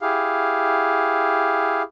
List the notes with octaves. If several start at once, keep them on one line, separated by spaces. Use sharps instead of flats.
E4 G4 G#4 F5